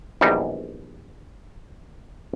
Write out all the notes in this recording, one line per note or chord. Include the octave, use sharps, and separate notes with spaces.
A#1 E2 G3 D#4